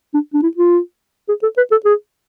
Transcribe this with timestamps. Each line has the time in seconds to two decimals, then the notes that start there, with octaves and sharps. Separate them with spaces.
0.14 D4
0.34 D4
0.43 E4
0.57 F4
1.29 G#4
1.43 A4
1.57 B4
1.72 A4
1.85 G#4